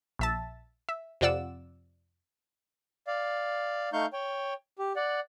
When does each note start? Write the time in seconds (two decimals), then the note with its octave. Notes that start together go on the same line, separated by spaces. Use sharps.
0.19 A#1 E5 A5
0.89 E5
1.21 F2 C3 F4 D5 F#5 E6
3.07 D5 F5
3.93 A3 D#4 F5 C#6 G6
4.13 C#5 G5
4.79 G4
4.96 D5 F#5